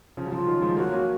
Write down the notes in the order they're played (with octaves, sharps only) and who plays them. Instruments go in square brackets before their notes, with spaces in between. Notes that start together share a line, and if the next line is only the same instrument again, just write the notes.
[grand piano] C#3 F3
F#3
[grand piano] C#3 F3 [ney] F4
[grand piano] D#3 F#3
F3 G#3
[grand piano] F#3 A#3 [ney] F#4
[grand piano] A#3 C#4